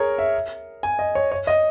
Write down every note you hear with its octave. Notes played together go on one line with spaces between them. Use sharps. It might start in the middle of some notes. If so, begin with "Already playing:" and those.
Already playing: G#4 A#4 C#5
E5
G#5
D#5
C#5
C#5
D#5